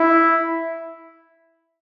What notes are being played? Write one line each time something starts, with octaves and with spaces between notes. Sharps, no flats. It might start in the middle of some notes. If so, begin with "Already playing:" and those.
Already playing: E4